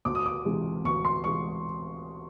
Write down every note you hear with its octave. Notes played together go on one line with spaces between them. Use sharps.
D2 D6
D#6
D6
C3 E3 G#3
D2 C#6
C6
C3 E3 G#3 C#6